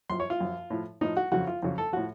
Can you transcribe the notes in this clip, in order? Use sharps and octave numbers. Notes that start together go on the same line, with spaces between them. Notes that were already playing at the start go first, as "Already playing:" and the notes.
F#2 F3 C6
C#5
F4
F#2 F3
A2 F3
A2 F3 D#4
F#4
F2 C#3 F#3 F#4
F4
F2 C#3 F#3
A4
A2 F3 F#4